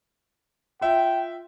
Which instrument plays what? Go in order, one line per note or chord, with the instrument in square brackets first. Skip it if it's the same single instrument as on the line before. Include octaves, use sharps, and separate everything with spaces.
[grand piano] F4 E5 [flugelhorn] G5